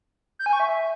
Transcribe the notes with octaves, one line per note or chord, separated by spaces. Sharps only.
G6
G#5
C#6
E5